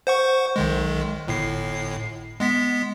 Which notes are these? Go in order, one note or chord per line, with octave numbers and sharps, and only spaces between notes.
C5 F#5 C#6
B1 D#3 G#3
G1 A2 C7
G#3 B3 B6